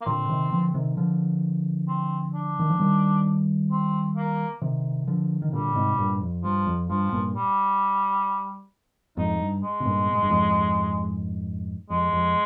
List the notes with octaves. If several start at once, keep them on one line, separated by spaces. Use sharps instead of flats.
A#3
A#2 D3 C4
C3 D#3
D3 F3
C3 D#3
D3 F3
C4
D4
D#3
F3
D#3 G3
C4
A#3
C3 D#3
D3 F3
D#3
A#2 D3 G3
G#2 C3
G2 A#2
F2
G2 F3
F2
G2 F3
G2 A#2
G3
F2 G#2 D#4
G2
G#3
C3
G2 A#2
A#2
G#2
G2
F2 G#2
F2 G#3
F2